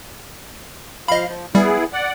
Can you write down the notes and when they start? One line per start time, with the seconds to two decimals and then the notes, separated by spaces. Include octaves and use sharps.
1.08 F3 D#5 F5 B5
1.26 F3
1.55 G3 B3 E4 G#4
1.93 D5 F#5